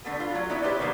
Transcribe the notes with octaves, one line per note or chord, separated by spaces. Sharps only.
D3 A3 B3
F4
F#3
B3 D#4 E4 C#5 E5
E4 G4 B4 C5 D5
D3 D#3 F#3 G#3 A#3